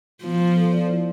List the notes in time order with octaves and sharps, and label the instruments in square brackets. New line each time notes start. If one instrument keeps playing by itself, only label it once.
[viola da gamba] F3 [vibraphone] B3
[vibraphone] F4
A4
D5
E4